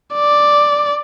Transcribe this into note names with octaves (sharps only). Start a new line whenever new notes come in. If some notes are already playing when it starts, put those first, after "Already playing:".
D5